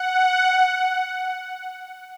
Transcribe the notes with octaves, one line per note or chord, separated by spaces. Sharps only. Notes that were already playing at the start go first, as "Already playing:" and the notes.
Already playing: F#5